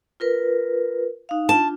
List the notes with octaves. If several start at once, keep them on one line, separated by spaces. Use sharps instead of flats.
F4 A#4 B4
D#4 F5
D4 F4 A5